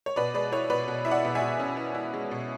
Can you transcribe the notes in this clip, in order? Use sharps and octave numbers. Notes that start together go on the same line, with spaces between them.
C#5
B2 B4 D5
G#3 B4 D5
E4 C#5
B2 B4 D5
B2
E4 E5
D5 F#5
B2
E5 G#5
B2
C#4
E4
E4
G#3
B2